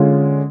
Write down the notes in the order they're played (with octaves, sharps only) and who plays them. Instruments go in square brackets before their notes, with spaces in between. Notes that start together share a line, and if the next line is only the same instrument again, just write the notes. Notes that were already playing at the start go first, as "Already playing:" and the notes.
Already playing: [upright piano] D3 G#3 C#4 F4